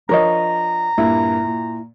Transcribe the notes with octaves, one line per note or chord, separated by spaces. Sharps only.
F3 D4 A#4 C#5 D#5 A#5
G2 A#2 A#3 E4
A#2